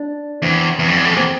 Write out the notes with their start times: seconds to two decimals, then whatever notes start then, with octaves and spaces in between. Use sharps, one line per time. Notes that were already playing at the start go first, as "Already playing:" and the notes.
Already playing: D4
0.42 E2 C4
0.79 E2
0.88 F2
0.96 E2
1.05 F2
1.13 E2 C4